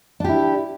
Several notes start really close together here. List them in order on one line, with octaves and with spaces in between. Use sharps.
D4 G4 E4